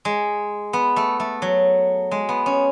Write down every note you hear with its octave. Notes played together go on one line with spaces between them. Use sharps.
G#3
B3
A3
A3
F#3
G#3
B3
C#4